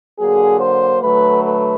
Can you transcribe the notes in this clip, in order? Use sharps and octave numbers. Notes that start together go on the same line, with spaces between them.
D3 F#3 A#3 G#4
C5
D3 F#3 A3 B4
B4